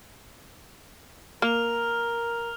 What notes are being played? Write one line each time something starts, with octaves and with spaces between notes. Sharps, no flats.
A#3 A#4 F6 F7